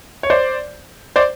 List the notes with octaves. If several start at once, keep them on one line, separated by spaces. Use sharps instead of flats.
C#5
C5 D5
C5 D5